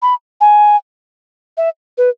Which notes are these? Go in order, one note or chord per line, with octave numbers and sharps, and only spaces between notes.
B5
G#5
E5
B4